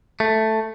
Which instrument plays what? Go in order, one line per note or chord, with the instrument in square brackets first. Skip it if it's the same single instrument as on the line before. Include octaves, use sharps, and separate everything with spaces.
[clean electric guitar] A3